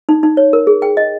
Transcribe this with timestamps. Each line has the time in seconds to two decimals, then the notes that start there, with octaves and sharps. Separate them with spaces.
0.09 D#4
0.23 D#4
0.37 C#5
0.53 A#4
0.67 G#4
0.82 G5
0.97 D#5